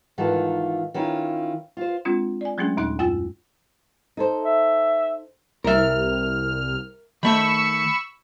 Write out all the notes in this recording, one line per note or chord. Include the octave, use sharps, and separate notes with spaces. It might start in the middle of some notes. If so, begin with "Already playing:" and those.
G#2 D#3 E3 F4 A4
D#3 C#4 E4 F4
F4 C5
G#3 C4 D4 F4
D5 G#5
F#3 G#3 A3 C#4 D4 G#4
D#2 A#2 D#4 C6 F#6
F#2 F4 G#5 E6 A6
D#4 A4 C5
E5
C2 A#4 E5 F6
D#3 A3 B5 C#6 E6